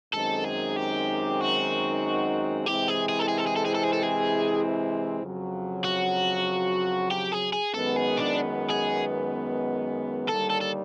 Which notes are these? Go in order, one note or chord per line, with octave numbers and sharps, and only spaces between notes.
F#2 D#3 G#3 C4 D#4 A4
G#4
G4
F#4
C3 E3 G#3 C4 E4 G4
G#4
G#4
A4
G#4
A4
G#4
A4
G#4
A4
G#4
A4
G#4
F2 C#3 F#3
F#4
G4
G#4
G#4
F#2 D#3 G#3 B3 A4
G#4
D4
G#4
D#2 D3 G3 A4
A4
A4